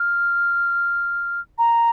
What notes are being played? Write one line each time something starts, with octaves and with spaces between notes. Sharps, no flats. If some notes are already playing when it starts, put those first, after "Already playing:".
Already playing: F6
A#5